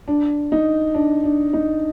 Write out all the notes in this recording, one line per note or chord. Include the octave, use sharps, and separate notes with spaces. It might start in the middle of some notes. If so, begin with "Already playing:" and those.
D4
D#4
D4
D4
D#4